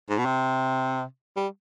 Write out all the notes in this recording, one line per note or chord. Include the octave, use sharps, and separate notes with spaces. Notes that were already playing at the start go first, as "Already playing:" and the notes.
G#2
B2
C3
G3